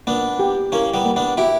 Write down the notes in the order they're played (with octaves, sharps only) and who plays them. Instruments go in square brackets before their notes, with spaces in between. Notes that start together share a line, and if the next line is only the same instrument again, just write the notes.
[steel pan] A#3 [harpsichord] B3 D4
[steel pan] G4
[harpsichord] A#3 C#4 [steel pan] E4
[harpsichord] G3 B3
[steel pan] A#3
[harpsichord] B3 D4
[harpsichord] E4 G4 [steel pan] F#4